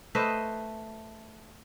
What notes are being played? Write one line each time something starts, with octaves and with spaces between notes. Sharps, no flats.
A3 B4 C5 D#5